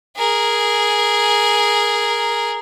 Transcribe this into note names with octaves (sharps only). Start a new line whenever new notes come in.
G#4 A#4